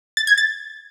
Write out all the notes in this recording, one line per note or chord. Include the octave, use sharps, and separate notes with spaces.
A6
G#6
A6